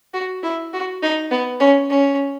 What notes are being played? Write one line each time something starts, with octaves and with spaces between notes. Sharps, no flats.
F#4
E4
F#4
D#4
B3
C#4
C#4